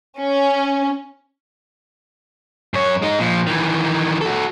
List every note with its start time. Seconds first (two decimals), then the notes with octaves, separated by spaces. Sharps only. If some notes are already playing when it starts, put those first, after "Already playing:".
0.20 C#4
2.74 F#2 C#5
3.02 G#3 D#4
3.20 A#2 F3
3.47 D#3 E3
4.21 F#4 A4